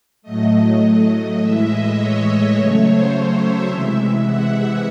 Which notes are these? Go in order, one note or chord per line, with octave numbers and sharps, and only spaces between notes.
A2 F#3 A3 D#5
A2 E3 G#3 E5
D#5
C#5
D#5
C#3 F#3 A3 C#5
C5
C#5
E5
C3 E3 G#3 E5
E5
F#5
E5